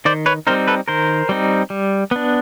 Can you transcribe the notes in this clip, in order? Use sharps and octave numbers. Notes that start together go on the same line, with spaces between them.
D#3 C5 D5
B4 C#5
G3 C4 D#4 A#4 C5
A4 B4
D#3 A#4 C5
G3 C4 D#4
G3
B3 D4